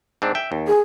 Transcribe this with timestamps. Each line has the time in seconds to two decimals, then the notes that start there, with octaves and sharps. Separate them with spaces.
0.22 G#2 C4 D4
0.35 E5 G5
0.52 D#2
0.67 G#4